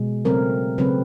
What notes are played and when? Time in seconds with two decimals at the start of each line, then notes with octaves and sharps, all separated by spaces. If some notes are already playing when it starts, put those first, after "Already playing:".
Already playing: B2 G#3
0.25 C#3 F#3 A3 C4 A#4
0.78 C#3 F#3 A3 C4 B4